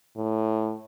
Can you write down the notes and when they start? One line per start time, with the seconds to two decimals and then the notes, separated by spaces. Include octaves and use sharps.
0.17 A2